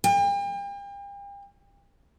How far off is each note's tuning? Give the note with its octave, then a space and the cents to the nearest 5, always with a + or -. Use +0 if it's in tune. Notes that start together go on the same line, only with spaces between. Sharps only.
G5 +40